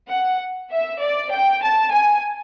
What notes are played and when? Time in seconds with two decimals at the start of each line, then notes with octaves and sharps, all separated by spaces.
0.10 F#5
0.71 E5
1.01 D5
1.31 G5
1.61 A5
1.91 G#5